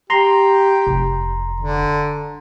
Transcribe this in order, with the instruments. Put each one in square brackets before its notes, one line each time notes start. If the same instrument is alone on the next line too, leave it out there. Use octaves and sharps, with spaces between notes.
[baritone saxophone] G4 [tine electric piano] A#5 C6
[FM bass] F1
[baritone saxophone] D3